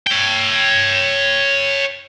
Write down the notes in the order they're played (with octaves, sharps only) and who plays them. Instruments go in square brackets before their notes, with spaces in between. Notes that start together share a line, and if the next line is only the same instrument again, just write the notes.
[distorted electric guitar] C#5 G5